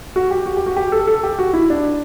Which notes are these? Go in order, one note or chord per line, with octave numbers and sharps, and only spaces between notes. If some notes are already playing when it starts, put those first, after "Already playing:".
F#4
G4
F#4
G4
F#4
G4
A4
A4
G4
F#4
E4
D4